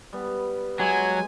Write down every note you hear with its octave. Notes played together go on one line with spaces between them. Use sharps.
G3 B3
F#3 G#3 G4 G#5